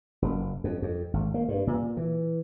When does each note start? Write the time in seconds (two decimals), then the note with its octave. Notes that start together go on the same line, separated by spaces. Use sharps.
0.22 F#1
0.64 F2
0.82 F2
1.13 G#1
1.34 A#3
1.48 G2
1.67 A#2
1.97 E3